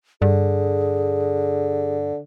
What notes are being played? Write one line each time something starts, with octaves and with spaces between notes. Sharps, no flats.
G2 D3 G#4